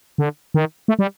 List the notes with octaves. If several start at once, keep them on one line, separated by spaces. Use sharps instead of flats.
D3
D#3
A3
G3